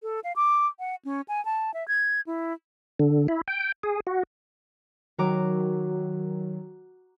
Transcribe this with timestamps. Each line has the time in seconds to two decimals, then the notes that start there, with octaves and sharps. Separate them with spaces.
0.03 A4
0.24 F5
0.36 D6
0.79 F#5
1.05 C#4
1.28 G#5
1.45 A5
1.74 E5
1.88 G#6
2.27 E4
3.00 D3
3.28 E4
3.48 G5
3.83 G#4
4.07 F#4
5.18 D#3 F#3 F#4 A#5 D6